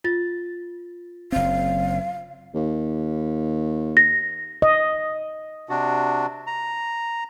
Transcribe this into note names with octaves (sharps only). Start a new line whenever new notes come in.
F4 A6
F#1 C4 F5
D#2
A#6
D#5
C3 D4 F#4
A#5